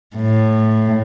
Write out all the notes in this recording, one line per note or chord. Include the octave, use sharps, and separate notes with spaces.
A2